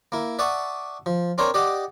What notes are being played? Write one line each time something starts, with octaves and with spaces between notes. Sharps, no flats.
A#3 E4
D5 E5 F#5 A5 C#6 D#6
F3
C4 D4 A#4 C5 C#5
G4 D5 D#5 F#5